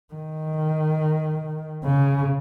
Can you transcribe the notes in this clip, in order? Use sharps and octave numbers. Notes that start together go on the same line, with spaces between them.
D#3
C#3